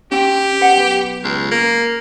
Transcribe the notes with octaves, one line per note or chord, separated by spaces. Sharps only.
C#4 G4 G5
B4 F#5
B1 B4
C#2
A#3